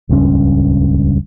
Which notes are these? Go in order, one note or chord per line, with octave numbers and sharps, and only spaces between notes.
D#1 C#2 G2 C#4